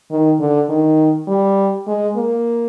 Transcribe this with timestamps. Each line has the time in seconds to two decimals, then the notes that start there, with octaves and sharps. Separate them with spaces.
0.11 D#3
0.40 D3
0.69 D#3
1.28 G3
1.88 G#3
2.16 A#3